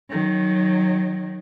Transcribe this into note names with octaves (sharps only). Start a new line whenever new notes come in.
D#3 F#3